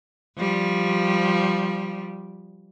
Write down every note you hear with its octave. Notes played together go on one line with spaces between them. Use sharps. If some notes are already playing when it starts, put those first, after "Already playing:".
F3 G3